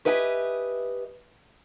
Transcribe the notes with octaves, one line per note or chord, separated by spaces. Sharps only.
G4 B4 D#5 E5 G5 G#5